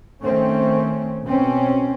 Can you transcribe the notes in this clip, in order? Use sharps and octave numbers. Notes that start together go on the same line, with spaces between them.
D#3 A3 C4 C#4
B2 C4 C#4